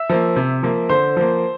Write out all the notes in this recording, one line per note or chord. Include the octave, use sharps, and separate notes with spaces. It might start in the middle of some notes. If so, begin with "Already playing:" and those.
Already playing: E5 E6
F3 A#3
C3
F3 A#3
D3 C5 C6
F3 A#3